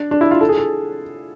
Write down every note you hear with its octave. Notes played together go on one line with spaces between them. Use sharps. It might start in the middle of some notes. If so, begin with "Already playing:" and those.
Already playing: D4
D4
E4
F4
A4
G#4
A4